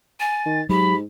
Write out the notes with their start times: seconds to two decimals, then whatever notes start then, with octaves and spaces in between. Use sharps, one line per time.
0.20 G#5 A6
0.46 D#3
0.69 G#2 F#3 G4 B5